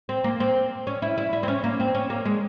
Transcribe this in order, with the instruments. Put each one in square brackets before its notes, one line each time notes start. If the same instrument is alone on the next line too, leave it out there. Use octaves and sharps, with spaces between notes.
[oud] C4
A#3
C4
C#4
E4
E4
E4
C4
C#4
A#3
C4
C#4
A#3
G#3